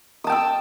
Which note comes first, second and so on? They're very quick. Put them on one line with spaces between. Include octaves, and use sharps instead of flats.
D#6 A5 G5 E6